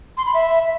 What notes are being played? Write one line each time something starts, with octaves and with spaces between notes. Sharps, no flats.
C6
B5
E5